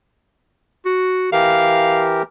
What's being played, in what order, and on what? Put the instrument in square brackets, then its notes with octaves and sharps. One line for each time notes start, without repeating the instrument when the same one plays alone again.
[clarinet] F#4
[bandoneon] E3 G4 A#4 [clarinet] F5